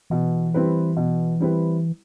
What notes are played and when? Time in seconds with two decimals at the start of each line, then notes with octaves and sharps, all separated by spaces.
0.10 B2 E3
0.54 G3 C4 E4 B4
0.97 B2
1.40 G3 C4 E4 B4